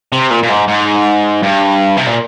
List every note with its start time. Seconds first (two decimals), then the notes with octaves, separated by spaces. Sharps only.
0.12 C3
0.31 A#2
0.43 A#2
0.49 G#2
0.68 G#2
1.42 G2
1.97 C3
2.06 A#2